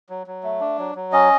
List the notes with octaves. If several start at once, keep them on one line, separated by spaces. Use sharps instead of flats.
F#3
F#3
A3
D4
F#3
F#3
C#4 D#5